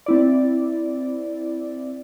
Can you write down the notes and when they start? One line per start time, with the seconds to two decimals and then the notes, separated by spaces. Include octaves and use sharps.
0.06 C4 E4 D5